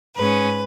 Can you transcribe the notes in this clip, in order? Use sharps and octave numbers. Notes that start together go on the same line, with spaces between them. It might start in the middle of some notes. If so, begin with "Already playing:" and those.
G#2 G#3 C#4 B4